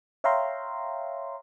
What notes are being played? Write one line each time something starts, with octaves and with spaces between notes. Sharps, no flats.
C#5 E5 F5 G5 A#5 C6